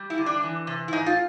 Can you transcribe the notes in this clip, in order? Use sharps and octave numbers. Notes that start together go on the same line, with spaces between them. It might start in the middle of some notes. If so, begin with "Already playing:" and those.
Already playing: G3
E4
D3
D4
E3
C3
E4
G#2 D#4
F4